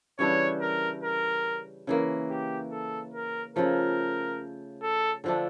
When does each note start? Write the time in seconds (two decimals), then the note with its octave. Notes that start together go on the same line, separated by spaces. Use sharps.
0.19 C#3 E3 G3 D4 C#5
0.61 A#4
1.03 A#4
1.87 C#3 E3 A#3
2.30 G4
2.71 A4
3.14 A#4
3.56 C#3 F3 A3 A#4
4.83 A4
5.24 D3 F3 A3 D4